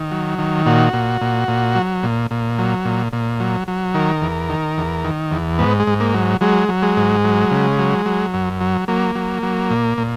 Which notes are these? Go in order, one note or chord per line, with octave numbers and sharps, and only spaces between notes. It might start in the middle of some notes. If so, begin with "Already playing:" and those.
Already playing: D#3
F#3
D#3
A#2 F#4
A#2
A#2
A#2
F#3
A#2
A#2
F#3
A#2
A#2
F#3
F#3
D#3 A#4
E2
D#3
E2
D#3
E2
G#2 B3
G#3
G#2
A#3
F#3
F#3 G#3
F#3
G#3
G#2
F#3
C#3
F#3
F#3
F#2
F#3
F#3 A#3
F#3
F#3
A#2
A#2